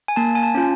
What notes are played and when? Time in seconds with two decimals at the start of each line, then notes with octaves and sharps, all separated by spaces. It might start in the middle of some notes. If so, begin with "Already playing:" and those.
0.08 G#5
0.16 A#3 A5
0.35 G#5
0.43 A5
0.55 C#4 F4